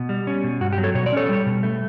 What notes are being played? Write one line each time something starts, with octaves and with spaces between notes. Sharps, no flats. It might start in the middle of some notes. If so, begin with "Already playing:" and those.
Already playing: B2
G3
C#4
B2
G2 F#4
G4
F#3
A4 C#5
B2 C#5
D5
C#4 A4 C#5
G3
B2
A3